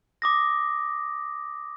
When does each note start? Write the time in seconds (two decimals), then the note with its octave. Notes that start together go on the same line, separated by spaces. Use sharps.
0.22 D6 D#6 A#6